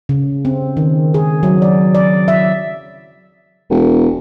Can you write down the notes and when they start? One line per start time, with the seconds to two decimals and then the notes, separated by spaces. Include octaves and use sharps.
0.09 C#3
0.45 C4
0.77 D#3
1.14 G#4
1.43 F#3
1.62 D5
1.95 D5
2.28 E5
3.70 E1